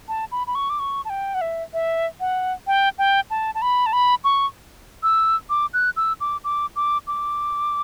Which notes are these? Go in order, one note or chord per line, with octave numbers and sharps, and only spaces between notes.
A5
B5
B5
C#6
D6
C#6
A5
G5
F#5
E5
E5
F#5
G5
G5
A5
A5
B5
A5
B5
C#6
E6
D6
F#6
E6
D6
D6
D6
D6